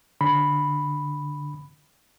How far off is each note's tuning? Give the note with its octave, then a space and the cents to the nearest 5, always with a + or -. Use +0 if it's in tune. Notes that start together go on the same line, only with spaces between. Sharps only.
D3 +0 B5 +0